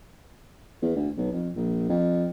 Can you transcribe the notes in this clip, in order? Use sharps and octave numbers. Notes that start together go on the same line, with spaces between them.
E2
D2
B1
F2
A#1
F2